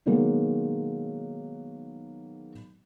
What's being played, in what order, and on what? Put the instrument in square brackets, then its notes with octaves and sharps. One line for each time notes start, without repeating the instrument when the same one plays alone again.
[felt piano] B2 D#3 F#3 G#3 A#3 B3